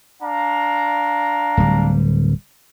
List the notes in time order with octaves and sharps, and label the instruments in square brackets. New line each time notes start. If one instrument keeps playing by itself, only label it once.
[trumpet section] D4 F5 A#5
[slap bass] D1 G3